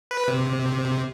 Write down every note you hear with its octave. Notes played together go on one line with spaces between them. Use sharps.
B4
C3